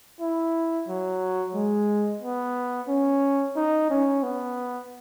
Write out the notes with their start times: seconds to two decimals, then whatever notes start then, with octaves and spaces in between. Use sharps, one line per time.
0.20 E4
0.88 F#3
1.55 G#3
2.22 B3
2.88 C#4
3.56 D#4
3.90 C#4
4.23 B3